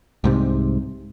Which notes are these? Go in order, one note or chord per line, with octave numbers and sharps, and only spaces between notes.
C2 G#2 C3